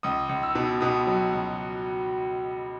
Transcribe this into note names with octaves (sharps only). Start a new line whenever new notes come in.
C#2 D#6
C#2
E6
B2
B2 D#6
F#3
C#2